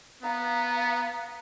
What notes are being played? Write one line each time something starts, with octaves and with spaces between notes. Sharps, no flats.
B3 F5 A#5